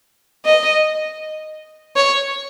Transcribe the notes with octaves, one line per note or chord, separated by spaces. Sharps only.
D#5
C#5